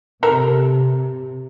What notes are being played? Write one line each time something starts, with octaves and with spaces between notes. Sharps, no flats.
C3 A4 A#4